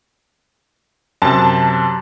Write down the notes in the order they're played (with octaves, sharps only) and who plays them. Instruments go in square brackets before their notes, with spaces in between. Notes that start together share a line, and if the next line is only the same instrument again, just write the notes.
[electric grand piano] F#2 C3 [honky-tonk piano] A5